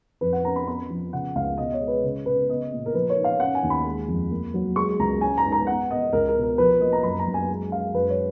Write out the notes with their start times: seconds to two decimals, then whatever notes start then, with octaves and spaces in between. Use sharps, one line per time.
0.21 F2 B4
0.33 F#5
0.44 C#4 A#5
0.56 B5
0.67 B3 B5
0.90 F3
1.13 C#3 F#5
1.35 C#2 F5
1.58 B2 D#5
1.73 C#5
1.81 G#3
1.88 B4
2.04 C#3
2.26 C#3 B4
2.49 B3 D#5
2.72 A#2
2.86 A#4
2.94 F3 B4
3.09 C#5
3.18 D#4
3.24 F5
3.40 C#4 F#5
3.55 G#5
3.63 D#2
3.70 B5
3.85 G#3
4.08 F2
4.31 A#3
4.54 F#3
4.76 G#3 C#6
4.99 C#2 A#5
5.21 C#4 G#5
5.38 A#5
5.44 G#2
5.52 A#5
5.67 B3 F#5
5.90 B3 D#5
6.13 C#2 A#4
6.29 A#4
6.36 B2
6.43 A#4
6.58 F3 B4
6.81 A#3 D#5
6.92 A#5
7.03 F#2 B5
7.19 A#5
7.27 F#2
7.34 G#5
7.49 G#3
7.72 G#3 F5
7.94 F#2 B4
8.10 C#5